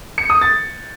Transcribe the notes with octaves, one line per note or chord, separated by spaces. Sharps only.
C#7
D#6
A6